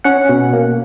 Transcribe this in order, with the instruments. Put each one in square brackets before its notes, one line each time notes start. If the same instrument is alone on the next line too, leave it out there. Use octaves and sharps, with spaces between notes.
[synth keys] C#4 F#5
B2
A#3